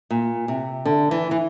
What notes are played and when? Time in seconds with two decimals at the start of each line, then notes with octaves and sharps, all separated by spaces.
0.11 A#2
0.48 C3
0.85 D3
1.11 E3
1.31 E3